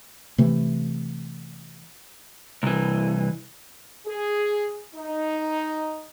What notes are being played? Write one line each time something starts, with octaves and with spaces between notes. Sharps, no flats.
C3 E3 A3
C2 E3
G#4
D#4